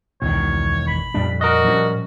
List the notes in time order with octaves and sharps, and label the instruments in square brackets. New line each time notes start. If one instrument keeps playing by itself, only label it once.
[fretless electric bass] E1 D#3 [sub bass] C2 [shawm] C#5
[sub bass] G#1 [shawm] B5
[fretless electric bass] F2 G3 D4 [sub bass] A#2
[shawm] F#4 [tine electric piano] A#4 D#5
[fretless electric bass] F3 G3 C#4